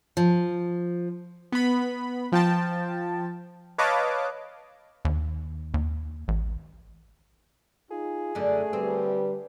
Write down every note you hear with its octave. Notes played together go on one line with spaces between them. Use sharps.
F3
B3 B5
F3 G5 A5
B4 C#5 D#5 F5 A5 D6
D#2
D#2
A1
D#4 F4 G#4
F#2 D3 A3
D3 G3 C4 B4